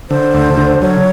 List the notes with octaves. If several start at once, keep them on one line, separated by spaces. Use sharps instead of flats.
D3 C5
D2
D3
F#3 C#5